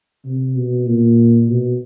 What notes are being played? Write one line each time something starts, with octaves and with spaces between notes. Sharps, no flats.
C3
B2
A#2
B2